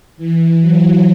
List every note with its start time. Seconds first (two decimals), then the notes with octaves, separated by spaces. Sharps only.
0.17 E3
0.60 F#3